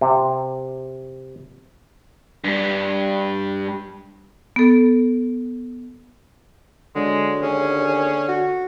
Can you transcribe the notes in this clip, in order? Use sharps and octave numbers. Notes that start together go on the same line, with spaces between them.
C3
G2 G3
B3 A4
D3 F#3 G#3
D#2 C#4 G#4
F#4